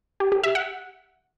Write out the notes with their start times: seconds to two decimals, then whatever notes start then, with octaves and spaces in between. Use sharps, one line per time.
0.20 G4
0.32 G4
0.43 E5
0.55 F#5